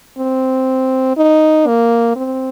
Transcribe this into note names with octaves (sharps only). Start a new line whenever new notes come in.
C4
D#4
A#3
C4